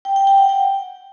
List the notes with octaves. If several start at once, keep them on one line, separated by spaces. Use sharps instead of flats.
G5
G5
G5
F#5
G5